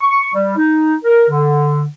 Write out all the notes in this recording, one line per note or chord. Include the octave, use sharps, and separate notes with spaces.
C#6
G3
D#4
A#4
D3